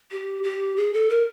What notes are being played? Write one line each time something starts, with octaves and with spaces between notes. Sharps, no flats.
G4
G4
G#4
A4
A#4